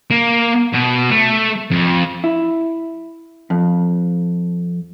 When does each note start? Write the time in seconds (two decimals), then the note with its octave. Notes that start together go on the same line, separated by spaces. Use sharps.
0.11 A#3
0.74 B2
1.11 A3
1.71 F2
2.24 E4
3.50 F2